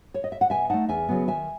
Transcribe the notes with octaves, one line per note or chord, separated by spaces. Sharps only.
C#5
D#5
E5
F#5
B2 E5 G#5
A3 D#4 F#5 A5
E2 E5 G#5
C#3 F#3 B3
D#3 E5 G#5